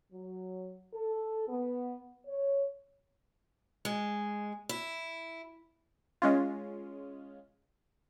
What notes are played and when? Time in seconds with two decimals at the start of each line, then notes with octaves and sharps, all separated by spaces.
0.13 F#3
0.94 A4
1.48 B3
2.27 C#5
3.85 G#3
4.69 E4
6.22 G#3 C#4 F4